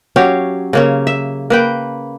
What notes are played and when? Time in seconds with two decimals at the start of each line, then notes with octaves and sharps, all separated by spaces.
0.16 F#3 C#4 G4 F5
0.73 C#3 A#3 C#4
1.07 E5
1.50 A#3 B4 G5